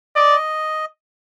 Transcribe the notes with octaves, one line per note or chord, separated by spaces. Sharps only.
D5 D#5